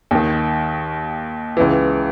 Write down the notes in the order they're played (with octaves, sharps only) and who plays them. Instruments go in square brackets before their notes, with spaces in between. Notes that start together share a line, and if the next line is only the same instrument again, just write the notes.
[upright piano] D#2 D#3
C#2 C#3 E3